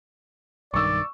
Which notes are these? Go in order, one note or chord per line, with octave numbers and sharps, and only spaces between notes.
B1 G2 D#3 D5 C#6 E6